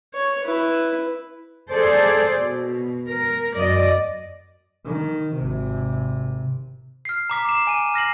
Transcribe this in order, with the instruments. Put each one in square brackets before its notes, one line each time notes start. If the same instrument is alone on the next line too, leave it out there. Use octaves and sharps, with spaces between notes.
[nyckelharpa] C#5
E4 B4
[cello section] G#4 A4 C5 D5
B2
A#4
F#2 D5 D#5
[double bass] D#3
G#1 C3
[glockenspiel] F6 C7
A#5 D6 B6
C7 E7
G#5 D#7
F6 A#6 C7 F#7